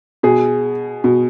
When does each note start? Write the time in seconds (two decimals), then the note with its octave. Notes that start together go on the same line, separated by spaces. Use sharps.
0.23 B2 G#4
1.04 B2